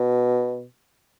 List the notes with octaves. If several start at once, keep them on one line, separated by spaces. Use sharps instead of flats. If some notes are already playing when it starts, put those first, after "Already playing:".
Already playing: B2